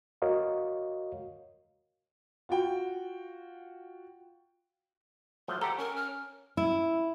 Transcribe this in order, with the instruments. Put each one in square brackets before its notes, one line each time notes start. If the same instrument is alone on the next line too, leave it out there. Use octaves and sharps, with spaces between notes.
[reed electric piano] F#4 A#4 C#5 D#5 F5
[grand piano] F4 F#4 G5
[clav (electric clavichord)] F3 F#3 A3 [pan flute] C6
[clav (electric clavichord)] G4 A4 [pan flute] F#5 [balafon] A#5
[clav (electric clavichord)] C#4 [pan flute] A#4
[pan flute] F6
[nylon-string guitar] E4